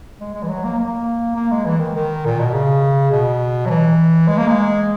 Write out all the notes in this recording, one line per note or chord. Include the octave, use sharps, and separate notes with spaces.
G#3
G#3
E3
F#3
A#3
A#3
A#3
G#3
E3
D#3
D#3
A#2
B2
C#3
B2
F#3
E3
G#3
A#3
G#3